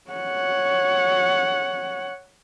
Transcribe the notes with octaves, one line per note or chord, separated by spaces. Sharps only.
C#5 F#5